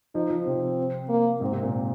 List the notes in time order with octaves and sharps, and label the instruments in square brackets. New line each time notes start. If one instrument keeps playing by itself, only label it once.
[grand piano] F3 [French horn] D#4
[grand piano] F3
[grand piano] C3 [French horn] C4
[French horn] A#3
[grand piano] G#2 [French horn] C4
[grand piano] C3
A#2